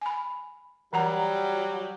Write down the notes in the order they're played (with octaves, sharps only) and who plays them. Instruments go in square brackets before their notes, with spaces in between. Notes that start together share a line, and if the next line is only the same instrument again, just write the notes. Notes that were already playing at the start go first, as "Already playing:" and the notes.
[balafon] G#5 B5
[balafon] E3 F#5 A#5 [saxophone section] F#3 G3